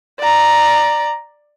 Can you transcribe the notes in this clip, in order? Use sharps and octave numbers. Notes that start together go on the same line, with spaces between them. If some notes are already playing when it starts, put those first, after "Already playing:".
D5 A#5